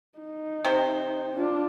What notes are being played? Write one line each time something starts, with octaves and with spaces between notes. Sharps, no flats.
D#4
C3 C5
D4 F4